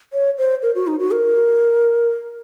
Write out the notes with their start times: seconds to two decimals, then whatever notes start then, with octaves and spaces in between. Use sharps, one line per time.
0.13 C#5
0.38 C5
0.62 A#4
0.75 F#4
0.87 D#4
0.99 F#4
1.11 A#4